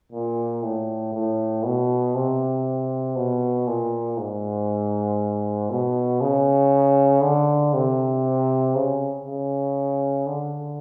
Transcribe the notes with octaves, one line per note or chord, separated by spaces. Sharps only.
A#2
A2
A2
B2
C3
B2
A#2
G#2
B2
C#3
D3
C3
C#3
C#3
D3